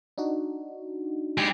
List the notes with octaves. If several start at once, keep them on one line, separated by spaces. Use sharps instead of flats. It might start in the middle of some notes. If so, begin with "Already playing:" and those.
D4 D#4 F#4
G#3 G4